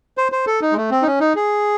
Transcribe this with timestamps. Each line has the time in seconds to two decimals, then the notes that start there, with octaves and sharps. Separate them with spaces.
0.18 C5
0.32 C5
0.47 A4
0.61 D#4
0.72 G#3
0.77 A3
0.91 C4
1.02 D#4
1.06 C#4
1.20 D#4
1.36 G#4